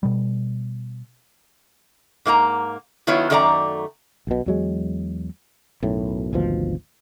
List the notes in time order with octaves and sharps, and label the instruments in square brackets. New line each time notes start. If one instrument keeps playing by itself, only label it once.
[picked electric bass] B2 G3
[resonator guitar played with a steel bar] G#2 A#3 G4 A#5
D#3 F#3 B3 E4 F4 C#5
F#2 D#3 A3 D5 A5 A#5
[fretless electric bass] B1 B2
E2 F#3 G#3
B1 F#2 A2
G#1 D2 B2 F3